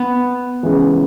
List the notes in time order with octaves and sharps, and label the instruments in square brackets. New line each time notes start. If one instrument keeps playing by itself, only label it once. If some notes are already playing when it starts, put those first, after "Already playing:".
Already playing: [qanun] B3
[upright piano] C#2 C#3 E3